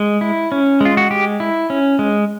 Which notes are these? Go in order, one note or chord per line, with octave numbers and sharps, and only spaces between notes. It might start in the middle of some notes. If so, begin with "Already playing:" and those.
Already playing: G#3
E4
C#4
G#3 F4
F#4
G#3 G4
E4
C#4
G#3